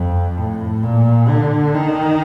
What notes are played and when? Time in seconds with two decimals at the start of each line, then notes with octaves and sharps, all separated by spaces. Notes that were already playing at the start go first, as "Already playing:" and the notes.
Already playing: F2
0.38 A2
0.83 A#2
1.28 D3
1.74 D#3